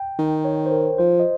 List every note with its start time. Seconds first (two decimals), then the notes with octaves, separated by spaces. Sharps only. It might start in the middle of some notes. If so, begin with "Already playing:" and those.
Already playing: G5
0.18 D#3
0.45 C#5
0.66 C5
0.72 A#4
0.98 F3 C5
1.20 D#5